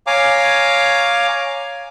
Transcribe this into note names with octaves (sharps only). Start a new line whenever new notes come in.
C#5 F5 G#5 A#5 D6